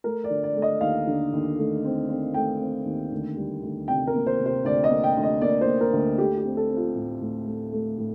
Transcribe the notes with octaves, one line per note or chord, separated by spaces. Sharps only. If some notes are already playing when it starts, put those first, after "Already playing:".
A3 A#4
D5
D3
D5
A3
D#5
D#2 F5
D3
D#2
A3
C4
C4
A3 G5
C4
D#2
D2
G3
D2
C3 G5
A#4
A#3
C5
C3
C5
D2 D5
D#5
A#3
G5
D2
D#5
A#3 D5
C5
A#3
A#4
D2
A3 G4
G4
C4
A4
C4
F4
A2
A2
A3
A3
A2